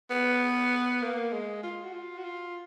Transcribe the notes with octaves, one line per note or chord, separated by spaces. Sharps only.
B3
A#3
G#3
F4
F#4
F4
F#4
F4